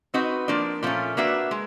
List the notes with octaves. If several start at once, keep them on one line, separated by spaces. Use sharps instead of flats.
C4 D#4 F#4 B4 D#5
F3 A#3 D4
A#2 F3 A3 C#4
A#3 D4 F#4 B4 E5
G#3